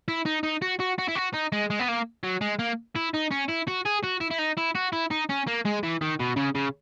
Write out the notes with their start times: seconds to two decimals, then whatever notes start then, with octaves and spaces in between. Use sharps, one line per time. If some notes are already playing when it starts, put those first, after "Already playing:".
0.08 E4
0.26 D#4
0.43 D#4
0.62 F#4
0.80 F#4
0.98 F#4
1.08 E4
1.15 F#4
1.34 D#4
1.52 G#3
1.70 G#3
1.79 B3
1.88 A#3
2.23 F#3
2.41 G#3
2.59 A#3
2.96 E4
3.14 D#4
3.31 C#4
3.49 E4
3.68 F#4
3.85 G#4
4.04 F#4
4.21 E4
4.31 E4
4.39 D#4
4.58 E4
4.75 F#4
4.93 E4
5.11 D#4
5.29 C#4
5.47 A#3
5.65 G#3
5.83 E3
6.01 D#3
6.19 B2
6.36 C#3
6.55 C#3